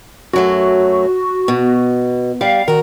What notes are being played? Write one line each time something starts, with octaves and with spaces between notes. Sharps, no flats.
F#2 F#3 A3 F#4
B2
G3 F5
D#3 F#4 A#4